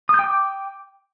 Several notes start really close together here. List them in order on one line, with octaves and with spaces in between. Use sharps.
D#6 G6 G5 D6